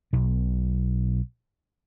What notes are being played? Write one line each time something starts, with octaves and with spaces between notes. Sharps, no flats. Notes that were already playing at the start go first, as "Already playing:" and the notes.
B1 B2